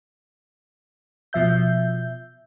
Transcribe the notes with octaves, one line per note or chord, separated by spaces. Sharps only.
B2 F3 E5 G6